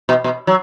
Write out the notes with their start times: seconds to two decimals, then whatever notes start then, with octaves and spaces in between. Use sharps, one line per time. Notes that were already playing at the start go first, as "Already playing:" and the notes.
0.09 B2
0.24 B2
0.47 F#3